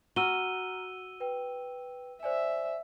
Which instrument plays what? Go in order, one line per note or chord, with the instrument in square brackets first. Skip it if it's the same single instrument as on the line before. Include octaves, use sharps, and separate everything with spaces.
[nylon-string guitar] F#4 [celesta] A#5 F6 [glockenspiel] E6 D#7 G7
[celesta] B4 G5
[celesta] C5 D5 G#5 [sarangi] E5